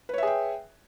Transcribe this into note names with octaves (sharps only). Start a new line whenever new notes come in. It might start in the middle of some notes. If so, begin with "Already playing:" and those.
G#4 B4 C#5 E5 G5